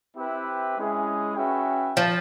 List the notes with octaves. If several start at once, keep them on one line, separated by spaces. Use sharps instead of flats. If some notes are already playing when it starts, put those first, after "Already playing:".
C4 E4 G4 B4 E5
G#3 C#4 E4 G#4
C#4 F#4 B4 E5 G5
F3